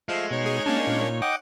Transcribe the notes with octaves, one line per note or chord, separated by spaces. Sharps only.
F3 G#3 A3 F5
B2 D#4 C#5
G#4
A#3 C#4 D4 A5
A#2
D#5 F#5 G5 D6